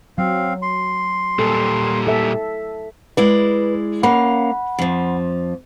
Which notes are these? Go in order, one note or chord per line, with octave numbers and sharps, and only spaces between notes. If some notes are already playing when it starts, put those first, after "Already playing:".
F#3 C4 F5
C6
A#2 G3 A4
A4 E5
G#3 E4 B4 D5
A#3 C#4 F5 F#5 B5
F2 F3